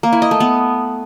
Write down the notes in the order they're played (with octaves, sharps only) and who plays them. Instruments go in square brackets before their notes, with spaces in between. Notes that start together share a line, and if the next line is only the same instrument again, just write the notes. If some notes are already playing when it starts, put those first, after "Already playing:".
[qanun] A#3
E4
D#5
A3
B3